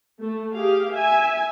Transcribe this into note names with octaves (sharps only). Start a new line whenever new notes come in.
A3
G4 G#4 F5
E5 G#5